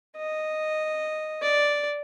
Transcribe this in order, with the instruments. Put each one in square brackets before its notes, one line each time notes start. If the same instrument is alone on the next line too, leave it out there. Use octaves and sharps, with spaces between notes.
[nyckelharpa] D#5
D5